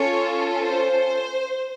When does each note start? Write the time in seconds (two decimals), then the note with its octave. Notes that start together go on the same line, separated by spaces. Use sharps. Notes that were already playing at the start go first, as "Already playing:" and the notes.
Already playing: C#4 F4 A4 C#5
0.63 C5